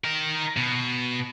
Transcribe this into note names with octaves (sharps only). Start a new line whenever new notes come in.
D#4 A#4
B2